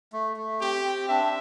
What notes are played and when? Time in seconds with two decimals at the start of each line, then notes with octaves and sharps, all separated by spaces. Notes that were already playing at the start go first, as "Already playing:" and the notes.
0.13 A3
0.37 A3
0.61 C4 G4
0.85 C4
1.09 D4 E5